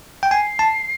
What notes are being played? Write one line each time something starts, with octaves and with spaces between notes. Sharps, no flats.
G5
G#5 C7
A5